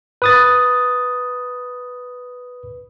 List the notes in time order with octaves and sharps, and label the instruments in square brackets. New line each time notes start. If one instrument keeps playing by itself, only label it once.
[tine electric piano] B4 D#6 A6